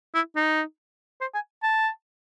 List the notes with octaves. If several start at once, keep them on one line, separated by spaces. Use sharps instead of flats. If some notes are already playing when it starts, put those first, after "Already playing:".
E4
D#4
C5
G#5
A5